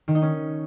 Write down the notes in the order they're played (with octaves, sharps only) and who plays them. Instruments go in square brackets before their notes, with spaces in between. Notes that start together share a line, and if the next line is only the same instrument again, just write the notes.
[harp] D#3
D#4
C#4